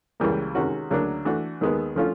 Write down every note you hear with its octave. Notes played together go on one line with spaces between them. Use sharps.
C#2 C#3 E3 G3 A#3
C3 D#3 G#3 C#4 F#4
D2 C#3 F#3 A#3 D4
E3 A3 D4 F#4
D#2 D#3 G#3 B3
D3 F3 A3 C#4 F4